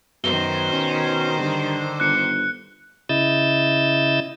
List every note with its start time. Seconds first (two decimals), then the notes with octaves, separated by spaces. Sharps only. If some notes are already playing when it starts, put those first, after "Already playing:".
0.24 F#2 B2 D#3 C5 G7
0.73 C#4
1.39 G2 D3
2.00 G1 F#6 C#7
3.09 C#3 E4 D#5 E6 G6 A6